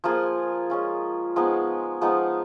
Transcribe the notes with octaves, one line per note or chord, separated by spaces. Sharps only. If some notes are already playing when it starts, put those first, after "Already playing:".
F3 A#3 F4 G#4
G#3 C#4 F4
F3 G#3 B3 D#4
F3 G#3 B3 D#4